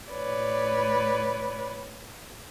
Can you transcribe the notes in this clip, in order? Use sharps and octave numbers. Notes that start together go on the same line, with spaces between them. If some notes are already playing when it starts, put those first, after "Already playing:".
A2 B4 C#5 D5